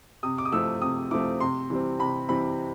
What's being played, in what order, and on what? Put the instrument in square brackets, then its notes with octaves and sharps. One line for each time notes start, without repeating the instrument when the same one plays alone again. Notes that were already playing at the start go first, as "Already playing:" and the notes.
[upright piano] C3 D#6
D6
D#6
F3 A3 C4 E4 E6
C3 D#6
F3 A3 C4 E4 D6
C3 C6
E3 G3 C4
C3 B5
E3 G3 C4 B5